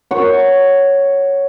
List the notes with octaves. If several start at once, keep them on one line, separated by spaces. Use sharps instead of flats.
C#5 F#5